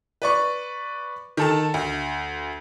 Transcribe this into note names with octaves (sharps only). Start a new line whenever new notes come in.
B4 D5 C#6
D#3 A4 A5
D2